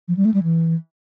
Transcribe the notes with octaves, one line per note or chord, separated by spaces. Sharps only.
F3
G3
A3
G3
E3